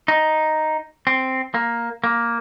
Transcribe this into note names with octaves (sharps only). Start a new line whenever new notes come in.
D#4
C4
A#3
A#3